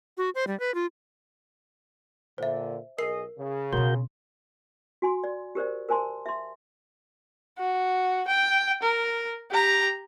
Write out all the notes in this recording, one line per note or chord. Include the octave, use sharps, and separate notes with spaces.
F#4
C5
G3
B4
F4
A#2 D3 C5 E5
B1 G#4 A#4 D#5 C7
C#3
B2 C4 F#4 A#4 C6 G6
F#4 G#5 C6
D5
G4 A#4 C5 D5
A#4 C5 G#5 A5 C6
E5 C6
F#4
G5
A#4
G4 A#5